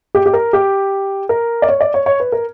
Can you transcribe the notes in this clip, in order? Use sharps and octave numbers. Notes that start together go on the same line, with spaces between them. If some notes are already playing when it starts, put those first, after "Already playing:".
G4
G4
A#4
G4
A#4
D5
C#5
D5
C#5
C#5
B4
A#4